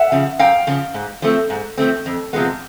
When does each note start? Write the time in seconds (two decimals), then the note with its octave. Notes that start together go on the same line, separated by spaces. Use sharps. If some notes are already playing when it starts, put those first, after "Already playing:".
Already playing: E5 F#5
0.12 C#3 F3
0.39 F#2 F5 G5
0.67 C#3 F3
0.94 G#2
1.22 F3 A3 C4
1.50 G#2
1.78 F3 A3 C4
2.06 F2
2.33 C3 F3 G#3 B3